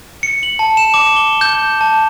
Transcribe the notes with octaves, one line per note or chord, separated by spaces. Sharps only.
C#7
F#7
A5
E7
D6
G7
G6
A5